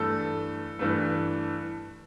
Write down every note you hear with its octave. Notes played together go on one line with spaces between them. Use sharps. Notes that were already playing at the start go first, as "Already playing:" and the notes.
Already playing: G2 E3 A3 A4
G2 E3 A3